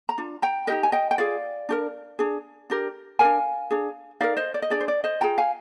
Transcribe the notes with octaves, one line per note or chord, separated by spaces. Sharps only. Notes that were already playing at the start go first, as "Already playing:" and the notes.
A#5
D4 F4
G5 A#5
D#4 G4 A#4 D#5 G5
G#5
D#5 G5
G5
F4 G#4 D5 F5
D4 G4 A#4
D4 G#4
D4 G4 A#4
G4 A#4 F5 G#5
D4
D4 G#4
D#4 G4 A#4 D5 F5
C5 D#5
D5
D#5
D4 G#4 D5
C5
D5
C5 D#5
F4 G#4 G5 A#5
F5 G#5